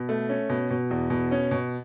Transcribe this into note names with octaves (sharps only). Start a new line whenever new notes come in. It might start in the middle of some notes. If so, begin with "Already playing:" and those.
Already playing: B2
A3
C#4
B2
B2
E2
B2
C#4
B2